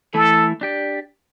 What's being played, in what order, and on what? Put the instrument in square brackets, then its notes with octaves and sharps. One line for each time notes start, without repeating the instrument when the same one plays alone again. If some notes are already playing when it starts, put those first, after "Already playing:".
[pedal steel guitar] E3 A3 E4 [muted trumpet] A4
[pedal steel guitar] D4 G4 D5